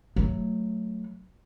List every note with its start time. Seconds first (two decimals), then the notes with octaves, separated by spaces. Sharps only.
0.16 F#3 A3